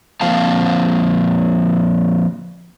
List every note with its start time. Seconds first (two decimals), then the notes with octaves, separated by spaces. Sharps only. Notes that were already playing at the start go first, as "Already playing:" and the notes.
0.21 F3 A#3 C4 F5 A5